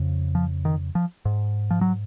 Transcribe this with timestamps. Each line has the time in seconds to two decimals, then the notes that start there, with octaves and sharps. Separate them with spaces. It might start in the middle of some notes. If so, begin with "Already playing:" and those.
Already playing: F2 C#3
0.35 F3
0.65 D#3
0.95 F3
1.25 G#2
1.71 F3
1.81 F#3